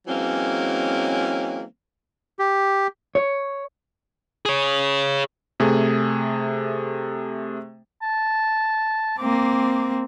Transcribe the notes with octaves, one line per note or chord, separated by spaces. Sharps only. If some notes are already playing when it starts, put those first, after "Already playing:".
E3 F#3 G#3 A#3 C4 C#4
G4
C#5
G#4 C#5
C3 A3 G#4
A5
A#3 C4 D6